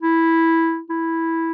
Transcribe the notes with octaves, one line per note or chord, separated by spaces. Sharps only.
E4
E4